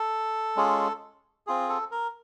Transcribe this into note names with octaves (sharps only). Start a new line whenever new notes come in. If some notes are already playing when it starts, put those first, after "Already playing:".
Already playing: A4
G#3 C#4 F4 G#4
C4 F4 G#4
A4
A#4